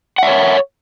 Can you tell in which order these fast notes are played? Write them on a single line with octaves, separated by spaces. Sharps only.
F#5 E5 C#5